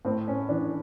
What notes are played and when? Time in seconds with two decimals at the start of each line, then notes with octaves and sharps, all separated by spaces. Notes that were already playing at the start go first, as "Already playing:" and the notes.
0.05 A2 C4
0.28 C#4
0.49 E3 D4